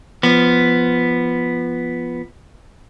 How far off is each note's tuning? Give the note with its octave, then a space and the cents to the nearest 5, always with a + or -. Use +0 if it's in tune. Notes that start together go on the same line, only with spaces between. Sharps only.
F3 -10 B3 +0